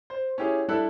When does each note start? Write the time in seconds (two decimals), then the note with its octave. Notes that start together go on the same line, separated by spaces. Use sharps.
0.10 C5
0.38 C#4 E4 G4 G#4
0.68 G3 D4 E4 A4 E6 F#6